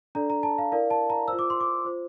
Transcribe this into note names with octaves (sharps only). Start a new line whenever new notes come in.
D4 A4 D5 A#5
A#5
A5
F5
E4 A#4 D5 F5
A5
A#5
F4 C5 E6
D6
C6
D6
F4 C5